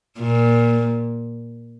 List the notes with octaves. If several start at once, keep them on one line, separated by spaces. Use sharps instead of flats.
A#2